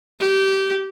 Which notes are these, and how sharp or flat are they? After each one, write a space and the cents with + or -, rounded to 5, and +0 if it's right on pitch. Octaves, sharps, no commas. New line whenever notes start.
G4 -20